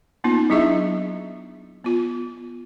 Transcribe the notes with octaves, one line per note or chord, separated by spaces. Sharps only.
A#3 B3 C#4 D#4 F4
F#3 D4 E4 G#4 D#5 E5
B3 F4